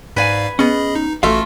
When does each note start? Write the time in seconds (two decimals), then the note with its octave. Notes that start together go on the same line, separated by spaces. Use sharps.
0.16 G#2 B4 D5 F5 G#5
0.59 B3 C#4 G#4 D#5 B5
0.95 D#4
1.23 A1 A3 F4 F#4 A4 E5 F5